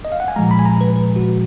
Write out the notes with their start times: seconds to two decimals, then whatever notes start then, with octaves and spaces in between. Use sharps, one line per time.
0.05 D#5
0.12 F5
0.20 F#5
0.28 G#5
0.36 A#2 F3 G#3 A#5
0.51 B5
0.59 G#5
0.65 A#5
0.81 B4
0.96 B4
1.16 F#4